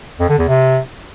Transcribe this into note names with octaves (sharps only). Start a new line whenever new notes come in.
F2
D3
E2
C3